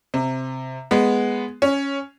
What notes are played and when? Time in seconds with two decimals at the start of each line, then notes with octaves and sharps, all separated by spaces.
0.14 C3
0.91 G#3 B3
1.62 C#4